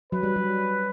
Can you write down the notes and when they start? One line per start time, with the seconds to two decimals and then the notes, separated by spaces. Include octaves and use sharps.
0.12 F#3 B4
0.23 G3
0.36 F#3